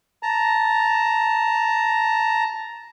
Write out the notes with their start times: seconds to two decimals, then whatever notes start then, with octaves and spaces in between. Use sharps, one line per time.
0.23 A5 A#5